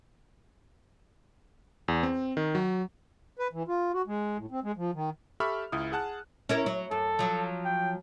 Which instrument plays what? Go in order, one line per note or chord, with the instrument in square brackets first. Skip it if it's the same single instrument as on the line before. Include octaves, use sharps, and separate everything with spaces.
[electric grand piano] E2
C4
D#3
F#3
[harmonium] B4
E3
F4
F#4
G#3
A2
C4
G#3
F3
D#3
[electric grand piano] G4 A4 E5 B5 C#6 F6
C#2 E4 D#6
G#4 F#5 A5 F#6
[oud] C#4 E4 A#4
F#3
[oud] F#2 [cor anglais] A4
[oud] F3 F#3
[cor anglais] G5